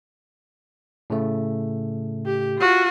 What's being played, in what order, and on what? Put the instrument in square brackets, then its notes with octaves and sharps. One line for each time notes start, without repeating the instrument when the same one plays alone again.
[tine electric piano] A2 C#3 A3
[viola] G4
F4 F#4